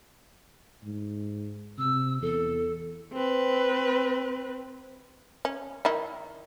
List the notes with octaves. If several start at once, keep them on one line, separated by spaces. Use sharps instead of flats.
G#2
C3 E6
E2 A4
C4 B4
C#4
D#3 D#4 E4